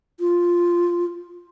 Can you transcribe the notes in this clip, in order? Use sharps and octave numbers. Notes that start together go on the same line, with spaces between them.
F4